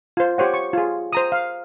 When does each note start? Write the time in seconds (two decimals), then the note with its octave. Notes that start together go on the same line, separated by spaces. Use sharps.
0.17 F4 C5
0.38 G4 C5 C#5 F#5
0.54 C#6
0.73 F4 G#4
1.13 C5 A#5 D#6
1.32 F5